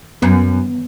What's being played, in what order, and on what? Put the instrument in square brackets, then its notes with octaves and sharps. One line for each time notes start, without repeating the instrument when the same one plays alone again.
[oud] F#2 [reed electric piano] B3